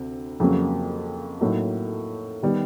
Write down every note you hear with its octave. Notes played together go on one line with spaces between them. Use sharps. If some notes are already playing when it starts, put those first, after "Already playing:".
Already playing: D2 C3
F2 C#3 F#3 A#3
A2 F#3 A#3 D#4
D#3 G3 B3